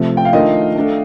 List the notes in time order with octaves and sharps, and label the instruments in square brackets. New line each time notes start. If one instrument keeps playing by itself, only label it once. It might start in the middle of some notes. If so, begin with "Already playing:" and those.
Already playing: [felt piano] C3 F3 A3
[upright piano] G5
F5
[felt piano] D#3 A3 D4 F4 A#4 [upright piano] D#5
[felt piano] A3 D4 A4